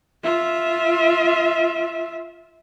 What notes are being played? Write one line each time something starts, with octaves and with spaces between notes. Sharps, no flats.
F4 E5